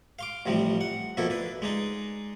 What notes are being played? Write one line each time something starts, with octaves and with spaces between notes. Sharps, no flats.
F5 C6 D6
A1 C3 F3 G3
F#5
B2 F3 A#3 E4 A4
D4 B4
G#3 D4 D#4